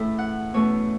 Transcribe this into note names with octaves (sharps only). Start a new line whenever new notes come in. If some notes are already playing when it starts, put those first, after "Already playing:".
Already playing: A2 C#3 E3 A3 E4 E5
F#5
E2 B2 A3 C#4 C#5